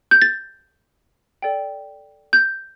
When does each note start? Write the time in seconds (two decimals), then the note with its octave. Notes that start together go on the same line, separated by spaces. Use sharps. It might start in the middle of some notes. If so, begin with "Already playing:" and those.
0.11 G6
0.22 A6
1.42 A4 D5 G5
2.33 G6